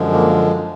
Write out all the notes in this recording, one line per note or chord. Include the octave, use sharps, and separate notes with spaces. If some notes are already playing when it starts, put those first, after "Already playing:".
Already playing: F#2 D3 F3 G#3
A#3